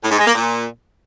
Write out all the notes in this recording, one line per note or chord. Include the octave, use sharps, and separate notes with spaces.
A2
G#2
G#3
A#3
A#2